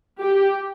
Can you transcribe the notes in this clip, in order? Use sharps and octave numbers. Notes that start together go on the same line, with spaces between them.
G4